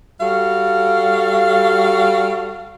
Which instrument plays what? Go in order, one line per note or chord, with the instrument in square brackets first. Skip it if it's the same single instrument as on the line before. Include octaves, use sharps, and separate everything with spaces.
[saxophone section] G3 F#4 A4 F5